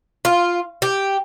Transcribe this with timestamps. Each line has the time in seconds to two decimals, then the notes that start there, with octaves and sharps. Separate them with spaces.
0.25 F4
0.82 G4